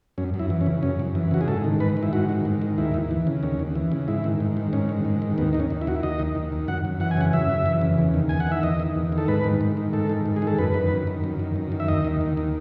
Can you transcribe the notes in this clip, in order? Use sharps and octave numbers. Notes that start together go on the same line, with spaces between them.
F#2 C#4
F#2
E4
E3
C#4
C#3
F#2 C#4
F#2
E3
C#3 F#4
G#4
G#2 A4
D#3
G#2 B4
D#3
E4
G#2 F#4
D#3
G#2
D#3
D#2 E4
D#2
E3
C#3
D#2 C#4
D#2
E3
C#3
G#2 E4
D#3
G#2
D#3
G#2 C#4
D#3
G#2
D#3
D#2 B3
D#3 D#4
C#4
D#2
E4
D#3 F#4
E4
D#2 D#5
D#3
D#2
D#3
F#2 F#5
F#2
E3 F#5
G#5
C#3 F#5
F#2 E5
F#2
E3
C#3
E2
D#3
E2 G#5
F#5
D#3 E5
E2 D#5
D#3
E2
D#3
A4
G#2 B4
D#3
G#2
D#3
G#2 A4
D#3
G#2
G#4
D#3
A4
F#2 B4
D#3
F#2
D#3
F#2
D#3
F#2
D#3
E5
D#2 D#5
D#3
D#2
D#3